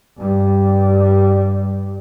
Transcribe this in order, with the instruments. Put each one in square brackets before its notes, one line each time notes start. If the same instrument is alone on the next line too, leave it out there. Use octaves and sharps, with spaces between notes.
[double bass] G2 G3